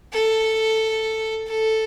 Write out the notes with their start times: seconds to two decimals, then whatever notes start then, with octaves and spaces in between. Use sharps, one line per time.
0.13 A4
1.47 A4